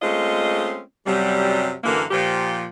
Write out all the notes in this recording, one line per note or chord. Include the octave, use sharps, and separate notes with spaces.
G#3 A3 C4 C#4 F4 D#5
F#2 C3 F#3 G3
F#2 D3 E3 A#3
A#2 F3 G4